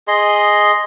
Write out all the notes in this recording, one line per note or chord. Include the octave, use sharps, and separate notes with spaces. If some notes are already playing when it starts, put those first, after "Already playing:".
G#4 D#5 C6